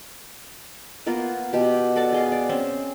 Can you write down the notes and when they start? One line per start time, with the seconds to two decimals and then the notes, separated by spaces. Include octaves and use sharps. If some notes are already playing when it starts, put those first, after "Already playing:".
1.06 A#3 B3 F4 A#4
1.53 B2 G4
1.96 F#4 A4 D5 D6
2.12 G#4 D#5 F5
2.32 D5
2.49 C4 C#4 C5